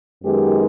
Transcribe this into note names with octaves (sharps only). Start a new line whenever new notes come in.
F#2 D#3 G#3 B3 D#4 G4